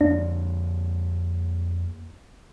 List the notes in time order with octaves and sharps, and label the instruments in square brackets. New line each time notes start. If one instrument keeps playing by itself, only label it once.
[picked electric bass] F2 A#3 [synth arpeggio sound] D4